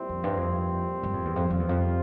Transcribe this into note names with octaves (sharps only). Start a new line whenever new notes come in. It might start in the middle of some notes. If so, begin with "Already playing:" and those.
Already playing: A#2 G3 C4 E4
F2
G2
F2
G2
F2
E2
F2
F2 C3 G3 C4 F4
E2
F2